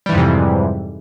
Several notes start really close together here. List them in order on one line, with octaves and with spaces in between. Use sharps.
G3 E3 G#2 F2 C3